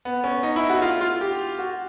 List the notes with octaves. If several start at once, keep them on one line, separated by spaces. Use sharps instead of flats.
B3
C#4
D#4
E4
F#4
F4
F4
G4
F#4